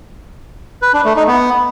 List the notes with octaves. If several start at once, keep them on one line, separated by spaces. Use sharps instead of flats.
B4
D4
A3
D#4
B3